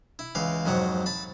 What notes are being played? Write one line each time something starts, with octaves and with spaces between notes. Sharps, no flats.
E4
C#2 E3 F5
F2 G#2 F#3 F#5
A5 B5